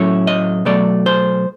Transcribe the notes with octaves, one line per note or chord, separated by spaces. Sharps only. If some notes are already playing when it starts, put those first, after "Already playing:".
Already playing: A2 F#3 A3 C#4 E4 C#5
D#5
B2 F#3 A3 D5
C5